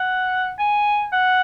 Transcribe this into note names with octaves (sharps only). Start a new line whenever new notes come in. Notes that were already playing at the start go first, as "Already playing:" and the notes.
Already playing: F#5
G#5
F#5